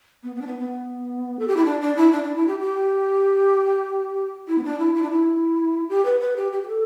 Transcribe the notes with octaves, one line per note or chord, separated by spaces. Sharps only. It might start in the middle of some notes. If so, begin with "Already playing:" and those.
B3
B3
D4
B3
B3
A4
G4
E4
D4
D4
E4
D4
D4
E4
G4
G4
E4
B3
D4
E4
E4
D4
E4
G4
B4
B4
G4
G4
G4
A4